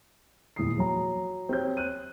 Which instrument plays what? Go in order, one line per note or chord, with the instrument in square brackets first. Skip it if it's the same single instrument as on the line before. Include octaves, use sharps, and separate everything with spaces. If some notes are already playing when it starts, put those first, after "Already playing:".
[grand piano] D#1 E2 G#2 G#4 D#6 C7
F#3 A#5
C4 G4 C#5 G6
F#6 D#7